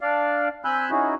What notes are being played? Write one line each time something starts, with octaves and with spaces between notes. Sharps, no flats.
D4 D5 F5
C4 G#5 B5 E6 F#6 G6
C#4 D#4 E4 F#4 G#4